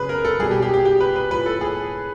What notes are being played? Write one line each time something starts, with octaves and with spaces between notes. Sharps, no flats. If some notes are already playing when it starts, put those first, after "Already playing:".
Already playing: C#3 F#3 G#4 B4
A#4
A4
B2 G3 G#4
G4
G4
G4
G4
B4
B4
A2 F3 B4
A4
G#4